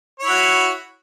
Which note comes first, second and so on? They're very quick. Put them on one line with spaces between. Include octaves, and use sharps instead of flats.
C#5 E4 F#4